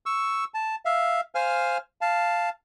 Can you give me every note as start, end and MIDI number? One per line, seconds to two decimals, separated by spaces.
0.06 0.44 85
0.06 0.44 88
0.54 0.75 81
0.85 1.21 76
0.85 1.21 77
1.35 1.78 72
1.35 1.78 77
1.35 1.78 80
1.35 1.78 89
2.01 2.49 77
2.01 2.49 81